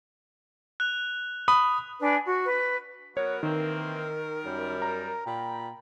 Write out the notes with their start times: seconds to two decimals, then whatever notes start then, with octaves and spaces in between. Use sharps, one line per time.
0.80 F#6 F7
1.48 B5 D#6
1.99 D4 B4 G#5
2.26 F#4
2.46 B4
3.17 F#3 B3 F#4 A#4 C#5
3.43 D#3 E3 A#3 C4
4.45 F#2 G3
4.82 A#5
5.26 A#2 G5 B5